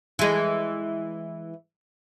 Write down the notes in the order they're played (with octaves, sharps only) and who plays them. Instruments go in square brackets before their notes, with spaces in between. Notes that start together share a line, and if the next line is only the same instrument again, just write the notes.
[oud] E3 G#3